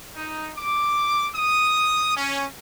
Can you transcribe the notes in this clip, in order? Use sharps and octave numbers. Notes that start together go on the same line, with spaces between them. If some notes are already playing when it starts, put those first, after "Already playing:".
D#4
D6
D#6
C#4